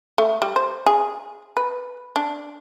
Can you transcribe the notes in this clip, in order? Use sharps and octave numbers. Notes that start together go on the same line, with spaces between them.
A3
G3
C5
G#4
B4
D4